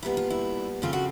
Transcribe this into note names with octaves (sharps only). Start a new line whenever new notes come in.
A#2 G3 B3 D4 E4
F4
E4
C#3 F3 A3 C4 F4
F#4